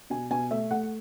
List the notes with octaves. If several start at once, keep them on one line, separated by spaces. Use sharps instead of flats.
B2 G#5
B2 G#5
A3 E5
A3 F#5